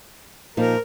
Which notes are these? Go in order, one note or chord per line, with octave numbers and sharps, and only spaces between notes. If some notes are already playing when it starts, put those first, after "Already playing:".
A#2 F3 D#4 A#4